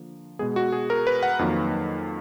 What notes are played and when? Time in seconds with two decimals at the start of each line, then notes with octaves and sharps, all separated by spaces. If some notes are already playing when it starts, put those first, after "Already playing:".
Already playing: D3 F3 A#3
0.39 B2 G#3 B3 G#4
0.56 F#4
0.72 G#4
0.90 A#4
1.07 B4
1.23 F#5
1.39 F2 D#3 F#3 A#3